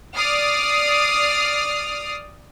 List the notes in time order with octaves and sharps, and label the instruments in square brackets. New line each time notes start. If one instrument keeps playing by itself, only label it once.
[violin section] D5 D#6 F6 C7